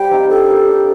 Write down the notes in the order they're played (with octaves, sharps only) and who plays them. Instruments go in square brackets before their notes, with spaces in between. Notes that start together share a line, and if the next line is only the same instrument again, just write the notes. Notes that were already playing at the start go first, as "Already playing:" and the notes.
Already playing: [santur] G3 G4 C5 F5 [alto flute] G5
[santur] C4 D#4
[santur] D4 [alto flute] A4
[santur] G4 A#4
D4